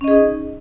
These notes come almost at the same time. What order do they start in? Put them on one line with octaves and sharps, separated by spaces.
C#4 D#5 G#4 D#4